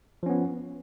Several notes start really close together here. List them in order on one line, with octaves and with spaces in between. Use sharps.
F3 C#4 B3